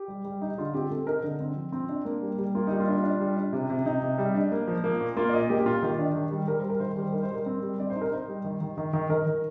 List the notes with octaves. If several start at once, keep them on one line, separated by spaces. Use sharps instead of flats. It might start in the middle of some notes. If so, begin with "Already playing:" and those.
Already playing: G4
G3
G3
D#4
D3 F4
C4 G4
C4 A4
D#4 A#4
D3
C4
F3
C4
D4
A#3
G3
G3
A#3 F4
G3 D#4
F4
D4
D4
G3
D4
C3
C3
C3 D#4
C3
G3
D4
A#3
F3
A#3
A#2
A#3 F4
D5
A#2 D#5
A#3 G4
G4
A#2 F4
D#3 G4
D4
D#3
G3
G3 A#4
C5
G3
A#4
D#3 C5
A#4
G3
C5
D#4 A#4
C5
G3 A#4
C4
G3
C4 D5
C5
D#4
A#4
D#4 C5
G3
D#3
D#3
D#3
D#3
D#3 A#4
D#3